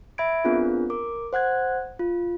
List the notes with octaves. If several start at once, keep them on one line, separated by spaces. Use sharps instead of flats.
E5 B5 G#6 D7
B3 C4 D4 F4 G#4 A#4
A#4 D6
C5 F#5 F#6 G#6
F4